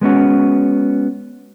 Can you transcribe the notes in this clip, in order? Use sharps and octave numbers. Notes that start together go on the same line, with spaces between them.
G#3 B3 C#4 F#4